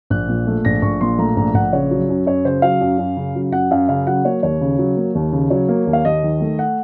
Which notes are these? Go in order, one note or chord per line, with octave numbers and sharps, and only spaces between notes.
A#1 F#6
A#2
A3
A#1 A#6
A#1 C#6
A#2 C6
A3 A#5
A#1 A#5
A#1 F#5
C#3 C#5
F#3
F#2
F#2 C#5
C#3 C5
F#3 F5
F#2
F#2
C#3
F#3
F#2 F#5
F#2 F5
C#3 F5
F#3 F#5
A#3 C#5
D#2 C#5
C#3
F#3
A#3
D#2
C#3
F#3 C#5
A#3
D#2
F5
D#2 D#5
D#3
A3
F#5